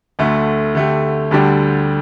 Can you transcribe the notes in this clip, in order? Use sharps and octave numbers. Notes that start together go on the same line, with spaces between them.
D2 D3 A3
D3 A3 G4
D2 D3 G3 D4 G4